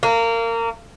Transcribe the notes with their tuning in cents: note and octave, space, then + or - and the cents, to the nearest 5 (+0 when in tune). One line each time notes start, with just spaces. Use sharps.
A#3 -25